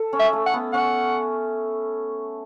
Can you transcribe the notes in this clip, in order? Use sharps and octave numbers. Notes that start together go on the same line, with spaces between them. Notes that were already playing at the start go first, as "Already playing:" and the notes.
Already playing: A4
C#4
E5
A3
F#5
B3
C#4 F#5